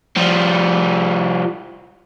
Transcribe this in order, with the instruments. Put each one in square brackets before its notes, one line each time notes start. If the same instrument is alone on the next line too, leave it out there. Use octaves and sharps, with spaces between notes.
[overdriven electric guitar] F3 G3